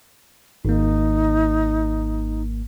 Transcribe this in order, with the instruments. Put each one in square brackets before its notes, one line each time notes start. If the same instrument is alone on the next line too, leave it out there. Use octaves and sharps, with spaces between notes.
[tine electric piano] G#1 A#3 [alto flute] D#4